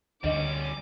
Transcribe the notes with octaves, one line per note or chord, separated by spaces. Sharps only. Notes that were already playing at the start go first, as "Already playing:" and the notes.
D2 G3 C#4 D#5 D6